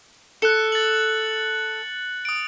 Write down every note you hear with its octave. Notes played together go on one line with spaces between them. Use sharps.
A4 F#6 C#7
A6 F#7
D#6 D7